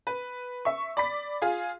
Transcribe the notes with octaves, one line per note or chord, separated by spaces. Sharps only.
B4
E5 C#6
D5 B5 B6
F4 G#4 F5